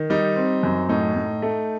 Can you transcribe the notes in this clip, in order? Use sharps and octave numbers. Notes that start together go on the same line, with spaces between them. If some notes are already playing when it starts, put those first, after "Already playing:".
Already playing: D#3
G3 D#4
C4
F#2
A2 D#4
A2
A3